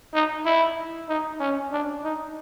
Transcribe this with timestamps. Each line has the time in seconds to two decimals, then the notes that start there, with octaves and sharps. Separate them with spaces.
0.14 D#4
0.45 E4
1.08 D#4
1.40 C#4
1.71 D4
2.04 D#4